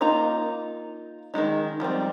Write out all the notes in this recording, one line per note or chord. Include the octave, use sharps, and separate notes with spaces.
A#3 D#4 F4 A#5
D#3 F#3 G#3 D#4
F3 G3 G#3 C4